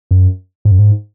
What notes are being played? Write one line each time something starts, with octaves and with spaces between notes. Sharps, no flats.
F#2
G#2
F#2
G#2